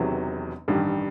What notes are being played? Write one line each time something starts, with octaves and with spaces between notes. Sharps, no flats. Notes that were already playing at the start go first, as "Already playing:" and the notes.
Already playing: E1 E2 C3 D#3 F#3
A1 G2 D#3 G3